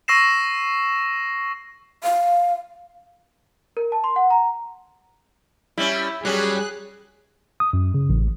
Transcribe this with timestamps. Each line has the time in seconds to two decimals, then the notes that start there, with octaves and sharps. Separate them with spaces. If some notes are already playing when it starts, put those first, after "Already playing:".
0.08 C#6 E6 A#6 C7 E7
2.04 F5
3.77 A#4
3.92 A5
4.04 C6
4.16 F#5
4.30 A#5
5.78 G3 C#4 E4
6.25 F#3 G3 C#4 G#4 F#6
7.60 D#6
7.73 F#2
7.94 C#3
8.10 A1